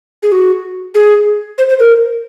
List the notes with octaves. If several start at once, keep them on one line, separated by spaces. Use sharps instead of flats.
G#4
F#4
G#4
C5
C5
A#4